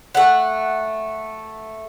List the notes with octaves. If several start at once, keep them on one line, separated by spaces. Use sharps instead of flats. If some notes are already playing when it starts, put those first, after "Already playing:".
A3 F#5